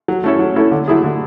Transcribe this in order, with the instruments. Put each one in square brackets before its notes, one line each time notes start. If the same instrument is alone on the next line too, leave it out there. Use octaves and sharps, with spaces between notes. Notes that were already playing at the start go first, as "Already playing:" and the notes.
[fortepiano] F#3
A3 C#4 E4 A4
F#3
A3 C#4 E4 A4
D3
F#3 A3 E4 G#4
D3